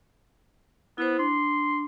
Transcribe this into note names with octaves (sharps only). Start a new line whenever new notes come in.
B3 E4 C5
D4 C6